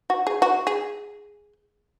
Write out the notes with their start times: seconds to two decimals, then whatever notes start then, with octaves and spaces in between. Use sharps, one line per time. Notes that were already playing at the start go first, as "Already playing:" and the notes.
0.10 F#4
0.27 G#4
0.42 F#4
0.67 G#4